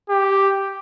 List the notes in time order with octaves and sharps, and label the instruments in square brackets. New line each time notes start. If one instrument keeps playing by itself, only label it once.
[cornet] G4